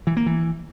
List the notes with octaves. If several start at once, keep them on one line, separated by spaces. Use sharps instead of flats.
E3
A#3
E3